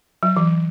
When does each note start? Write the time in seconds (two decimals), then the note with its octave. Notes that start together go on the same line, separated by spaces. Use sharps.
0.23 F#3
0.37 E3